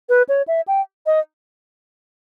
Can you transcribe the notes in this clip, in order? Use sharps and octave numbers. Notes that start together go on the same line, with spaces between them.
B4
C#5
E5
G5
D#5